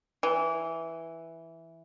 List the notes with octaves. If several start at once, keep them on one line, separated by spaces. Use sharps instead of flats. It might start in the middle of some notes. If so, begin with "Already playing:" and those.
E3